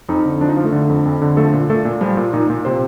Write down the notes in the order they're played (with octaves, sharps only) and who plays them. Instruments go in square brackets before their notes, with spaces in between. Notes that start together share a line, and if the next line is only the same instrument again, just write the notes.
[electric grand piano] F2 D#4
D3
F3 D4
D#4
F3 F4
A3 A4
D3
F2
F2
D3
F3 A3 A4
A#2
A#2 A3 A4
A#2
F3 G3 G4
A#2
A#2 D#4
A#2
C3 C4 C5